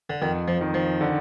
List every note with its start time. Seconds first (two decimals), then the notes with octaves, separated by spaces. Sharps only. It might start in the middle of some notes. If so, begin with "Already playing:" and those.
0.10 D3
0.22 F2 D#3
0.48 F3
0.61 D#3
0.74 F3
1.01 D3